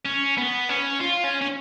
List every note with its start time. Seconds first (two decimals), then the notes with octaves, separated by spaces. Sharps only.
0.06 C#4
0.38 B3
0.69 C#4
1.01 F4
1.24 C#4
1.42 C#4